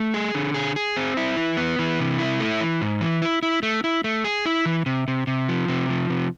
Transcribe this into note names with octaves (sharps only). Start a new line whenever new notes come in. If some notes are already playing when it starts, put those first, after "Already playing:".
Already playing: A3
G#4
D3
G#4
G#4
C4
E4
E3
B3
E3
C3
E4
A3
E3
G#2
E3
E4
E4
A3
E4
A3
G#4
E4
E3
C3
C3
C3
F3
C3
F3
C3